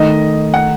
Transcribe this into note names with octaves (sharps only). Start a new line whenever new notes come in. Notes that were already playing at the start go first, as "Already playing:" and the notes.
Already playing: D#3 A3 D#4 D#5
F#5